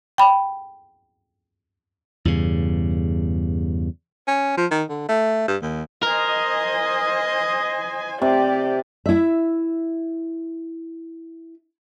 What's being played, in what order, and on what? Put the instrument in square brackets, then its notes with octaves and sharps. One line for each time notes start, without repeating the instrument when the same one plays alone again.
[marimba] G5 B5
[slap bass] E2 G2 C#3
[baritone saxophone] C#4
F3
D#3
D3
A3
G2
D#2
[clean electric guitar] A#4 [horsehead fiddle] C5 G#5 [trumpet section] D#5
[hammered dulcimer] C3 [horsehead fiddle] G4 D5
[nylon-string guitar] E4 E5